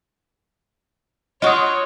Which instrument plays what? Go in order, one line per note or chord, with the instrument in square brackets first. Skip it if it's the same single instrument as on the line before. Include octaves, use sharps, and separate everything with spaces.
[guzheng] F4 F#4 [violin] C#5 [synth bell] D#5 C#6 D#6